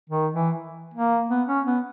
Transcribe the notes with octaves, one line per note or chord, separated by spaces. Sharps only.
D#3
E3
A#3
B3
C#4
B3